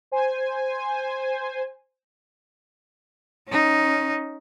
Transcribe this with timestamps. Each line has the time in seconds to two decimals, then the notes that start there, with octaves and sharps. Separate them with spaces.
0.12 C5 G#5
3.48 C#4 D#4